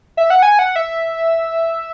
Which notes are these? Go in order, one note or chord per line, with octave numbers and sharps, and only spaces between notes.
E5
F#5
G#5
F#5
E5